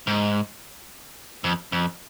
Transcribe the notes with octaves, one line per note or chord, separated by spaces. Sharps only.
G#2
F2
F2